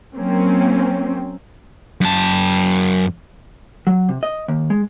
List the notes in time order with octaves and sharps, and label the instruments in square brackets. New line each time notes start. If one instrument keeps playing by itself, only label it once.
[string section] F#3 A#3 C4 C#4
[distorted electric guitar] F#2 A5
[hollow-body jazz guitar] F#3
C3
D#5
D#2
G#3